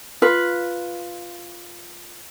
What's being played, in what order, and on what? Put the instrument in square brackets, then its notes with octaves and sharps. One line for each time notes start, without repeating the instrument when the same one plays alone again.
[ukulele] F4 B4